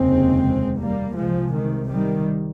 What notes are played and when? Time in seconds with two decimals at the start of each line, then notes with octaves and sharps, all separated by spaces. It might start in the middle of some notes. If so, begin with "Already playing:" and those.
Already playing: F1 D#2 C#3 G#3 C4
0.78 G3 A#3
1.16 C2 C3 F3 G#3
1.53 D#3
1.89 D#3 G3